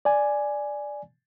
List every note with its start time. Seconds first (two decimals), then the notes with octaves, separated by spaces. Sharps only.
0.05 D5 G#5